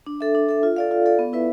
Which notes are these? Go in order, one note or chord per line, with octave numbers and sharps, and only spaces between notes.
D4
A4 E5
D4
A4 E5
F4
A4 D5 F5
F4
A4 D5 F5
B3
E4 B4 E5